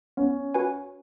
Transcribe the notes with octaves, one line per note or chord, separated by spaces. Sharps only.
B3 C#4
F#4 B4 G#5